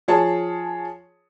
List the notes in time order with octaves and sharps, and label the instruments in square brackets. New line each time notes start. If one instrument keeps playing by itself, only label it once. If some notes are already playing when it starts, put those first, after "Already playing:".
[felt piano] F3 G#4 C#5 A5